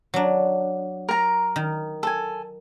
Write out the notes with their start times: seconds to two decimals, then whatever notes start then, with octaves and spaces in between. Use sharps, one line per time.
0.14 F#3 D4
1.09 A#4 A#5
1.56 D#3
2.03 A4 G#5